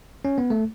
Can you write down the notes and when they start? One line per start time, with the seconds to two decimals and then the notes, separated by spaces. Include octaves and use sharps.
0.25 C#4
0.38 B3
0.50 A3